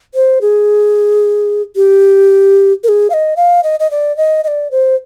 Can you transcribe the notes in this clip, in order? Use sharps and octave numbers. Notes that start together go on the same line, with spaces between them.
C5
G#4
G4
A#4
G#4
F5
D#5
F5
D#5
D#5
D5
D#5
D#5
D5
C5